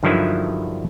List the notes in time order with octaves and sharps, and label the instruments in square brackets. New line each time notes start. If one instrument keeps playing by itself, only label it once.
[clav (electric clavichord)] G2 D3 D#3 F3 F#3 E4